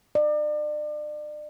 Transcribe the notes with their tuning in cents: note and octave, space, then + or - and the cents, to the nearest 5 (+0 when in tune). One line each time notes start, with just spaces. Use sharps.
D5 +35